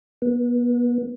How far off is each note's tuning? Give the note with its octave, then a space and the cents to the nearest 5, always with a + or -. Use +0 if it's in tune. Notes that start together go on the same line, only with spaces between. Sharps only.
B3 -35